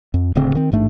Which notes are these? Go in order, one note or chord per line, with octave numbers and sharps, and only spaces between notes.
F2
D1 D2 C#3 C4
D#3 C4
A1 G#2 A3 D4